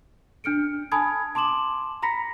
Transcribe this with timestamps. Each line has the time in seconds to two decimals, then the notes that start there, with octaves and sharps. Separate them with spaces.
0.44 D4 F6 C#7 D7
0.92 G#5 A5 B5 D#6 G#6
1.35 A5 C6 D6 E7 F#7
2.02 A#5 B5 A#6 B6 C#7